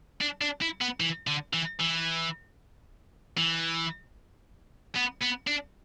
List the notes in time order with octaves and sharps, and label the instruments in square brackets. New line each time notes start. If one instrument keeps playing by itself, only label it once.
[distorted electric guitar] D4
D4
E4
B3
E3
D3
E3
E3
E3
B3
B3
D4